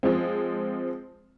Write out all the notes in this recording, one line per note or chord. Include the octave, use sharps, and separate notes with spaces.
F3 G#3 C4